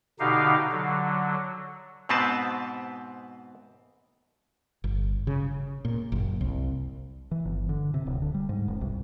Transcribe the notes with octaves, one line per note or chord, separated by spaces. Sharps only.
B2 D3 D#4 G4 F5
D3 F#3
G#2 B2 B3 C4 B4 A5
G1
C#3
A#2
F#1
C2
E3
G1
D3
C3
D1
D3
G3
G#2
F1
C2